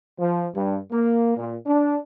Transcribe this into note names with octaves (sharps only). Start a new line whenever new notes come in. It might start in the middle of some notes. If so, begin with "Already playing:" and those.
F3
G2
A#3
A#2
D4